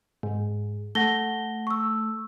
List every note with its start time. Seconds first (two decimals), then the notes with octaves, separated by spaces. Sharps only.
0.23 G#2
0.95 A3 F#5 A#6 G7
1.67 C#6 E6